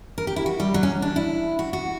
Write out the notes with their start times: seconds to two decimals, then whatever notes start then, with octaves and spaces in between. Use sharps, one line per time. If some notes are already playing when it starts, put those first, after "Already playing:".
0.18 A#4
0.27 G4
0.36 E4
0.46 F#4
0.60 G3
0.74 F#3
0.83 C#4
1.02 D4
1.16 E4
1.59 F#4
1.73 F#4